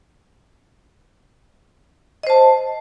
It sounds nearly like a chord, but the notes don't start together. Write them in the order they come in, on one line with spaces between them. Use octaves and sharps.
D#5 C5 A5